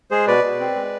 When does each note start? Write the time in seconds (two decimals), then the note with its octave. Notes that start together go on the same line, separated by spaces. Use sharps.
0.11 G#3 G#4 C5
0.27 B2 B4 D5
0.44 B2
0.60 C4
0.76 G#3